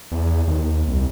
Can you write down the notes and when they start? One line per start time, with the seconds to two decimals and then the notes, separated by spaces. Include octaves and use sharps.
0.12 E2
0.47 D#2
0.87 C2